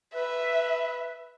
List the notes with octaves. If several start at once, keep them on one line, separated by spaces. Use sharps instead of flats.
B4 E5